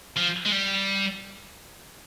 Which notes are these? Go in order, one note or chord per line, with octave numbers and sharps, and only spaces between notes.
F3
G#3
G3